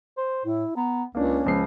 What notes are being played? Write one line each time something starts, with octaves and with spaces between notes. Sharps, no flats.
C5
A2 E4
B3 A#5
C#2 A#3 C#4 D4
C#2 F3 C7